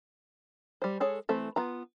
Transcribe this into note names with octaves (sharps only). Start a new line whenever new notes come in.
G3 C5
G#3 G#4 A4 C#5
E3 A3 C4 A4
B3 F4 A#5